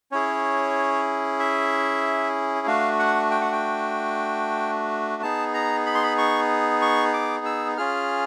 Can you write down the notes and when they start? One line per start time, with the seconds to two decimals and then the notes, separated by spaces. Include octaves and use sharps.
0.11 C#4 E4 G#4 C#5
1.39 E5
2.67 A3 D4 F#4 F5
2.99 F#5
3.31 G5
3.41 F#5
3.52 G5
5.22 B3 D#4 G#4 A5
5.54 A#5
5.86 B5
5.95 C6
6.03 B5
6.18 C#6
6.82 C#6
7.14 D6
7.46 E6
7.77 C#4 F4 G#4 F6